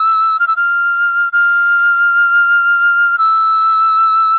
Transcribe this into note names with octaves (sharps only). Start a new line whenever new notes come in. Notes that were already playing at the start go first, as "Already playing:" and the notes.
Already playing: E6
F6
E6
F6
F6
E6